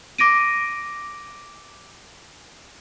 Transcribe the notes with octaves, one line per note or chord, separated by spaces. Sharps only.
D6 A#6 D7 D#7